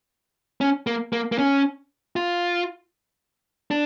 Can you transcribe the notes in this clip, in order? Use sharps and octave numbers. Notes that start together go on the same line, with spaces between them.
C#4
A#3
A#3
A#3
C#4
F4
D4